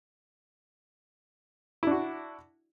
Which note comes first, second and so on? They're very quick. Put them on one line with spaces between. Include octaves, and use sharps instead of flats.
E4 D4 F#4